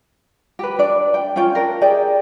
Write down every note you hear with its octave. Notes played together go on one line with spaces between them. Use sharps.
G4 B4
D4 D5
G5
C#4 F4 C#5 G5
D4 A#4
G4 G#4 D5 G5